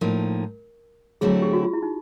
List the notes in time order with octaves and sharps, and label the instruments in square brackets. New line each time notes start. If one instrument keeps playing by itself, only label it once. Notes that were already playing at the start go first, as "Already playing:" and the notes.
[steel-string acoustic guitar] A2 F3 A#3 D#4 [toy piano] A#4
[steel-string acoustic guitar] D3 F#3 A3 C4 E4 [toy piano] G#4
[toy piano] G4
F#4
F4
E4
D#4